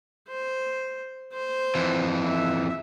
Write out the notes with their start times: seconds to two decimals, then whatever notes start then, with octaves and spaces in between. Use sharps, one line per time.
0.28 C5
1.33 C5
1.75 F2 E3
2.25 E5